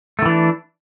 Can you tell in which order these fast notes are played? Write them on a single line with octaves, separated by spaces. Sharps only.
A3 D#3 E3 D4